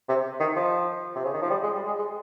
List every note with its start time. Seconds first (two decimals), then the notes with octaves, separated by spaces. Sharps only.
0.09 C3
0.40 D#3
0.56 F3
1.15 C3
1.25 C#3
1.33 D#3
1.42 F3
1.50 G3
1.63 G#3
1.75 G3
1.86 G#3
1.99 G#3